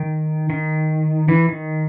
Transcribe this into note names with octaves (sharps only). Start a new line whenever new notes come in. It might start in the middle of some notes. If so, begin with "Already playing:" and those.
Already playing: D#3
D#3
E3
D#3